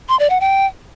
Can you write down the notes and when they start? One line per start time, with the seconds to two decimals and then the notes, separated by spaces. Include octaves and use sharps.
0.09 C6
0.20 D5
0.30 F#5
0.41 G5